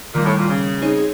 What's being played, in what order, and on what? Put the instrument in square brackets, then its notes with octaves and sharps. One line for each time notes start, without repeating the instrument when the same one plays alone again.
[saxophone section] A#2 [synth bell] D#3 G3 A#3
[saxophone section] A2
A#2
C#3
[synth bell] C4 D#4 G#4 C#5